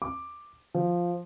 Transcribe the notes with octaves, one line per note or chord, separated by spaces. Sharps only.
D6
F3